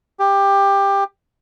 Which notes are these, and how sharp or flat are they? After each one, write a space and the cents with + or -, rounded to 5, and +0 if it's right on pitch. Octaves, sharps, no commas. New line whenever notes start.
G4 +15